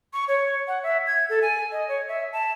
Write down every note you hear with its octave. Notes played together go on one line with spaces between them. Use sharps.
C#6
C#5
F#5
E5
G#6
A4
G#5
D#5
C#5
E5
A5